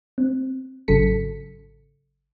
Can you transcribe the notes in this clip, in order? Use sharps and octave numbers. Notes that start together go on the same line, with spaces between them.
C4
G#1 C#3 F#3 A4 B6 C#7